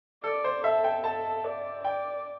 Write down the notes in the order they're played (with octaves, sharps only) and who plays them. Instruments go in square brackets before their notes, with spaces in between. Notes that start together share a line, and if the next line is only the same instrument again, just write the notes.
[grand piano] A4 [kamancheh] D5
[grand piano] C5
[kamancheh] A4 [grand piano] E5
[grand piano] G5
[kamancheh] A4 [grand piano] A5
[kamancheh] D5
[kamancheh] D5 [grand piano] G5